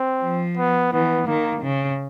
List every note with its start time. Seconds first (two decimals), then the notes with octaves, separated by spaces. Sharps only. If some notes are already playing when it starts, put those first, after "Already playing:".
Already playing: C4
0.22 F3
0.57 B3
0.92 E3 B3
1.27 D#3 A#3
1.63 C#3